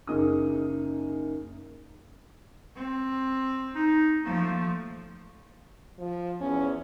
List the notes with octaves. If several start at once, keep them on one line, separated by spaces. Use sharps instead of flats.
F#1 D#4 G#4 A#4 D#6
C4
D#4
F3 A3 A#3
F3
E2 C#4